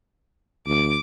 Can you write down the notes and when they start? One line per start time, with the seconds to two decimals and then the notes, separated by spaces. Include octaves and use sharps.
0.67 D2 D6